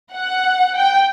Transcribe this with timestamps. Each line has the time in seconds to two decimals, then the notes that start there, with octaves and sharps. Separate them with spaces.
0.14 F#5
0.76 G5